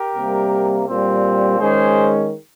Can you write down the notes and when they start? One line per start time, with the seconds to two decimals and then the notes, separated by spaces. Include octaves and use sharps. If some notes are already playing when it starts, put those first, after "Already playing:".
Already playing: G4 A#4
0.14 C3 G3 A#3
0.87 A#2 G3 C4
1.59 D#3 G#3 C#4 G#4 C5